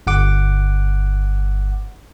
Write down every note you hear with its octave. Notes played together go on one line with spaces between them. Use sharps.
G1 F#5 D6